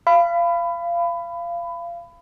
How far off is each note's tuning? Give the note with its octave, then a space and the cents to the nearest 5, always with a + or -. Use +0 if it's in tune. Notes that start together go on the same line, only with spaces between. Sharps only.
F5 -25 B5 +20